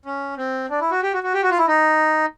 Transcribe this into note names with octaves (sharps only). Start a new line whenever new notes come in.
C#4
C4
D4
E4
F#4
G4
F#4
F#4
G4
F#4
F4
E4
D#4